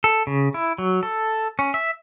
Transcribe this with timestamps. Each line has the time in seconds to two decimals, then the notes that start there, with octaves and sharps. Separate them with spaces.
0.04 A4
0.27 C#3
0.54 E4
0.78 F#3
1.03 A4
1.59 C#4
1.74 E5